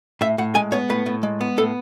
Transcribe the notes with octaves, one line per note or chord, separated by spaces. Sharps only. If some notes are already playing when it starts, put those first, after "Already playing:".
A2 E5
A2 F#5
G#3 G#5
B3 C#5
A2 B4
A2
G#3
B3
A2 A4